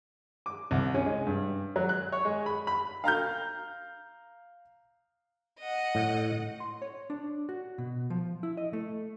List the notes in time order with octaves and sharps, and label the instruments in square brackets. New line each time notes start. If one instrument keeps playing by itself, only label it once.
[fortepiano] D6
C2
C#4
G#3
G2
F#3
F#6
C#5
G#3
B5
B5
[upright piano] F5 A#5 F6 G6
[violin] D#5 F#5
[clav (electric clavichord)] A2
[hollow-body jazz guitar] C6
C#5
D4
F#4
B2
F3
E4
D#5
A3